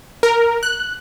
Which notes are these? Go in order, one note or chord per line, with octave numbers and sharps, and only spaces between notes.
A#4
F#6